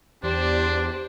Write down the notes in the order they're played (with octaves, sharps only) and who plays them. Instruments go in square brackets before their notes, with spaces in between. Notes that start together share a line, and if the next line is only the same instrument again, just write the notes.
[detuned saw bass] E2 [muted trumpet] D4 [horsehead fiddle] G4 [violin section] C5 D5